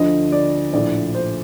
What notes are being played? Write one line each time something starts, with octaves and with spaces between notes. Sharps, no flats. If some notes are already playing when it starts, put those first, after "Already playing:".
Already playing: D2 D3 F3 D#5
D5
A#1 A2 F3 D5
C5